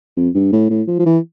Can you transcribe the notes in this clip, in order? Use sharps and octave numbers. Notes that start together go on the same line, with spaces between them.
F2
G2
A2
A2
F3
F3
E3